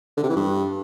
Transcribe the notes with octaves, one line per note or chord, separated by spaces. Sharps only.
D3
C3
E3
G2